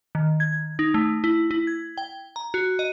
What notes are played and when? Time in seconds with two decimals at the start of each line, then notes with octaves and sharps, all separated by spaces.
0.15 D#3
0.40 G#6
0.79 D#4
0.94 A3
1.24 E4
1.51 E4
1.67 G#6
1.98 G5
2.36 A#5
2.54 F#4
2.79 D#5